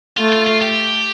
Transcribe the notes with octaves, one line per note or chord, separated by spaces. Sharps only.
A3 F4
F4
F4
G4